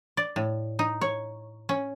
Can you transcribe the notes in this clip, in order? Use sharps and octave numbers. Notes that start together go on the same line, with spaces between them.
D5
A2
D#4
C#5
C#4